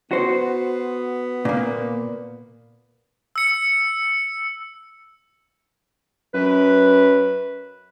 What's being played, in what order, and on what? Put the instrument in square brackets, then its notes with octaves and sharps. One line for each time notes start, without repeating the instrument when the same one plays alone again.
[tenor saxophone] B3 [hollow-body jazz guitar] F#4 C5
[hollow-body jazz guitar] A#2 A#3
[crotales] E6 C#7
[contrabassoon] F#2 [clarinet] B4